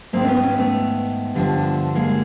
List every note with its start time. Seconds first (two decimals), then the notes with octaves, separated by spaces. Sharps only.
0.13 G#2 D#3 A#3 C4
0.24 D4
0.28 B3 C#4
0.43 B3 C#4
0.58 A3 B3
1.35 G2 D3 F3
1.95 G#3 A#3